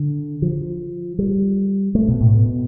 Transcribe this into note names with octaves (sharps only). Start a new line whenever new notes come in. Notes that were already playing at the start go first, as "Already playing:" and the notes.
Already playing: D3
F3
G3
A3
B2
A2
B2